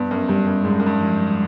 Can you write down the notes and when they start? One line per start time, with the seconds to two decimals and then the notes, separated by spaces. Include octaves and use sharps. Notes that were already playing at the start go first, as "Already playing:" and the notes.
Already playing: G2 B3
0.11 F#2
0.29 G2 G3
0.47 F#2
0.65 G#2 G#3
0.72 G2
0.79 F#2
0.86 G2
1.01 F3